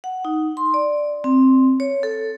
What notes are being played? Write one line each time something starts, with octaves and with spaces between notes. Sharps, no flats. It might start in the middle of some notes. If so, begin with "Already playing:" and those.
F#5
D#4
C6
D5
C4
C#5
A4